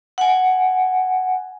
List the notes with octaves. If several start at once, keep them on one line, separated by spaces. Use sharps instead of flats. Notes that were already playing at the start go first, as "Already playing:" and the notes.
F#5 G#5